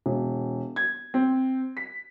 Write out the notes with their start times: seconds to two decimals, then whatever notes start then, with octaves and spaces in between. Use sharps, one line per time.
0.06 E1
0.76 G#6
1.14 C4
1.77 B6